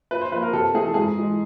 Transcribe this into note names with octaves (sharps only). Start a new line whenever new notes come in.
A#2 B4
C5
F3 A#3 B4
A#4
C3 A4
E3 A3 C4 G#4
A4
G#2 G#4
E3 G#3